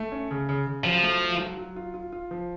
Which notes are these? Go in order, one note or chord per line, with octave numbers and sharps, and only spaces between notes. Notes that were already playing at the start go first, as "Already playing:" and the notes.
Already playing: A3
C#4
C#3
C#3
C#3
F3 F#3
A3
F4
F#3
F#3
F4
F4
F4
F3